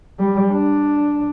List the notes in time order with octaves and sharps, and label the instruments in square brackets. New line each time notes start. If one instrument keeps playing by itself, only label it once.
[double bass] G3
D4